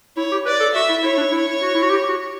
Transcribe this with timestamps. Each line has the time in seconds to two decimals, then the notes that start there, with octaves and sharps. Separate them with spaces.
0.17 E4 C#5
0.32 G4
0.46 B4 D5
0.60 A4
0.75 F#4 E5
0.89 E4
1.03 E4 C#5
1.17 D4
1.32 E4
1.62 F#4
1.75 E4
1.83 F#4
1.90 G4
2.09 F#4